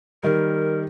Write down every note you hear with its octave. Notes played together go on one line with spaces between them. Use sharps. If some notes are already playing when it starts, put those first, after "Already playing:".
D#3 G3 A#4